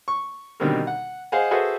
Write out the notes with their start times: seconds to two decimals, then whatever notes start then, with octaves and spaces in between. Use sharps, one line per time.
0.08 C#6
0.60 B2 D3 D#3 G3 C4 A#4
0.87 F#5
1.32 G#4 C5 D#5 F5 F#5 G#5
1.51 F#4 G#4 A4 B4 C5 E5